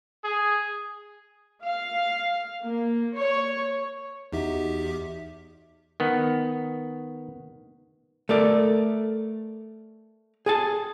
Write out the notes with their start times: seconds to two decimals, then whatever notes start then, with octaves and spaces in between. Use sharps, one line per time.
0.24 G#4
1.62 F5
2.63 A#3
3.15 C#5
4.32 E2 E3 D#4 F#4 G4 E5
6.00 D#3 B3
8.29 A3 A#4 D5
10.46 G#4 G#5 A5